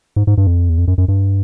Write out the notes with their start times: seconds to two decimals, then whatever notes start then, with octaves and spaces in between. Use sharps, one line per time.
0.16 G#2
0.27 G#2
0.38 G2
0.47 F2
0.69 E2
0.78 F2
0.88 F#2
0.98 F#2
1.08 G2